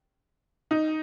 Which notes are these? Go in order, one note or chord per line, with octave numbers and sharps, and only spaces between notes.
D#4